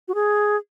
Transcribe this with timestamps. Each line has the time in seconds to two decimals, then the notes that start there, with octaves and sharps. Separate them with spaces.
0.08 F#4
0.15 G#4